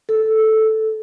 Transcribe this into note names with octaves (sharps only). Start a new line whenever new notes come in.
A4